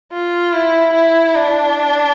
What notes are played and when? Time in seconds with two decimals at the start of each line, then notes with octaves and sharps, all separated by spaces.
0.12 F4
0.54 E4
0.94 E4
1.36 D4